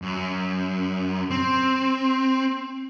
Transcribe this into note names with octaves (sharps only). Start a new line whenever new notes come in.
F#2
C4